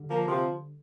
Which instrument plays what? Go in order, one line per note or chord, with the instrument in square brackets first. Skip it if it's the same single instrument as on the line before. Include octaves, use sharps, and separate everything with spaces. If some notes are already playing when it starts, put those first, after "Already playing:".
Already playing: [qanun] D3 G3
[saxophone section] F3 A#3
C3 F3